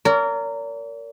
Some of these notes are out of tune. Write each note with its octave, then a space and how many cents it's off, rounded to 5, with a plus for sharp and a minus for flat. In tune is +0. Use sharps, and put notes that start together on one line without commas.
A#4 -15 D5 -45